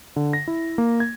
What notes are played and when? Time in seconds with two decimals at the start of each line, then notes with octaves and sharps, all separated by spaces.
0.16 D3
0.33 A#6
0.48 E4
0.78 A#3
1.00 G#6